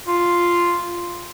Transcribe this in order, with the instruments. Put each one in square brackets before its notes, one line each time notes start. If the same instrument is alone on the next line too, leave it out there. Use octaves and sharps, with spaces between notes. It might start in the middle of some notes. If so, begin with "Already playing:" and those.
[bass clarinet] F4